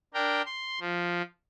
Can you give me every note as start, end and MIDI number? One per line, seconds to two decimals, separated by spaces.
0.14 0.42 62
0.14 0.42 70
0.14 0.42 79
0.46 0.79 84
0.81 1.22 53